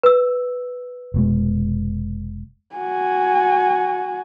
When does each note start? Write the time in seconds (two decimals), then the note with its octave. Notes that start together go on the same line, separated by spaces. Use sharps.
0.03 B4 E6
1.14 F1 B2 G#3
2.76 F#4 G#5